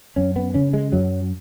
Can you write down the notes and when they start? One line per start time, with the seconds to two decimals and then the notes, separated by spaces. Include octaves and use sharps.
0.16 F#2 C#4
0.36 B3
0.54 C#3 C#4
0.73 G#3
0.92 F#2 F#3